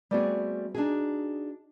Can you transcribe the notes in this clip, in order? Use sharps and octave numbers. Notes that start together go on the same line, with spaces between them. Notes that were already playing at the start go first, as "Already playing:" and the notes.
G3 A3 B3 C4 F#4 G#4
D4 D#4 F#4 G#4